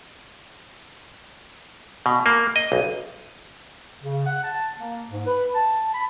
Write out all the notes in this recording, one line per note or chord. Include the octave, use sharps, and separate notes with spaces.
B2
A#3
D#5
B1
C#3
F#5
A5
A#3
G#2
B4
A5
B5